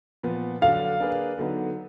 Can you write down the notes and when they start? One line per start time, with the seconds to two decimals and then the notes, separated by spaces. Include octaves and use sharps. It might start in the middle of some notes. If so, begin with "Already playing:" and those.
0.23 A#2 F3 B3
0.61 D3 F#3 D4 F5
1.00 A#3 D4 G#4 B4
1.38 D3 F#3 B3 D#4